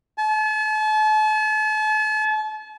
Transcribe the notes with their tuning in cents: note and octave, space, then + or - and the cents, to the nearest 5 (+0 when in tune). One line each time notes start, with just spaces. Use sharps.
A5 -40